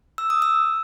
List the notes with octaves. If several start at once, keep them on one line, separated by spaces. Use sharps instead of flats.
E6
D#6
E6